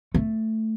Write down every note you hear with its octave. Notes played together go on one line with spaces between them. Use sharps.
A3